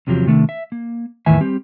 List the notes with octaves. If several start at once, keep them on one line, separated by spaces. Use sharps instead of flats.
E2 C3 F3 F#3 G4
C3 D#3 A3 D4
E5
A#3
E2 A2 D#3 B4 E5 G#5
G3 C4 G4